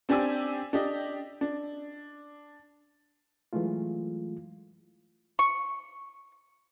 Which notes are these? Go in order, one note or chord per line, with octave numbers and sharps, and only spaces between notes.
C4 D4 G4 G#5 D6 E6
D4 G4 D#5
D4
E3 F#3 G#3 A3 F4
C#6